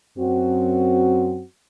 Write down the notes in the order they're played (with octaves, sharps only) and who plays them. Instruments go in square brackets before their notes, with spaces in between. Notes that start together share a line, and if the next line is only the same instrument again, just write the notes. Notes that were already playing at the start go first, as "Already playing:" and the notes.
[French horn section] F#2 C4 F#4